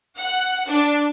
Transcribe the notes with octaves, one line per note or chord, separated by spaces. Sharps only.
F#5
D4